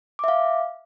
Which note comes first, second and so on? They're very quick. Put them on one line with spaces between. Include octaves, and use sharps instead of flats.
D6 E5 F5